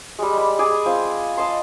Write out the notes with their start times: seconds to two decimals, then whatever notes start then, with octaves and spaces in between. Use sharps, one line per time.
0.19 G3 G#3
0.38 D5 B5
0.59 G#4 D5 G#5
0.86 C4 F4
1.37 D#5 A5 C6